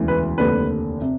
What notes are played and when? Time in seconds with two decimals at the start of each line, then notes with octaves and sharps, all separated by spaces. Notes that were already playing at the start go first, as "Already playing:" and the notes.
Already playing: E1 D2 C#3 E3
0.08 B4
0.38 F1 D#2 D3 B4
1.02 C3